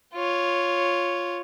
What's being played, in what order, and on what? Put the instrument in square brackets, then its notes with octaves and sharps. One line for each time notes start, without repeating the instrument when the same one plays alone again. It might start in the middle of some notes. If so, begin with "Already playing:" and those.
[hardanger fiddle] F4 C#5